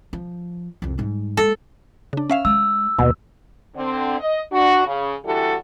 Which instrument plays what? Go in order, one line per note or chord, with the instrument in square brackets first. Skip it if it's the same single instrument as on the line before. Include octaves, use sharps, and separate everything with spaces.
[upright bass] F3
C2 F2
G#2 G3
[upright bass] G#3 A#3 [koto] A4
[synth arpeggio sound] C#3 D4
C#4 E5 F5
[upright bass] G#3 [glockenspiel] E6
[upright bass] D#2 [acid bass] B2
[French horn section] D3 C4
D#5
D4 F#4
C#3
D3 E3 G3 F#4 G4 A4